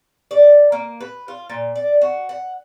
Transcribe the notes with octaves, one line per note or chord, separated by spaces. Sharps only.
D5
A#3
B4
F4
A#2
D5
F#4
F#5